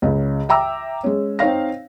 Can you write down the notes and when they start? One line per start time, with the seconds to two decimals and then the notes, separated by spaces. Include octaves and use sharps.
0.02 C#2 C#3
0.49 E5 G5 A#5 D6 E6
1.04 G#3 C#4
1.39 C4 D#4 C#5 F5 A#6